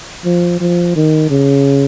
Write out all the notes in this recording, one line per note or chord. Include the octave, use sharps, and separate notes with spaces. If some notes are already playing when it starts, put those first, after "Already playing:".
F3
F3
D#3
C#3